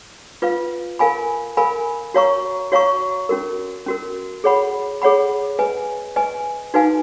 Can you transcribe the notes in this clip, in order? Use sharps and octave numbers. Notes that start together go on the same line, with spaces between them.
F4 B4 F5
A#4 F5 G#5 B5
A#4 F5 G#5 B5
F#4 C#5 F5 A#5 C#6
F#4 C#5 F5 A#5 C#6
C#4 F#4 A#4
C#4 F#4 A#4
G#4 C#5 F#5 B5
G#4 C#5 F#5 B5
B4 D#5 G#5
B4 D#5 G#5
D#4 F#4 B4 F5 G#5